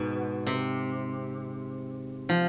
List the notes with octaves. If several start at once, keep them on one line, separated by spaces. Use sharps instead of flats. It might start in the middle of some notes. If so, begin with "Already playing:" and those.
Already playing: G#2 B2
C3
F3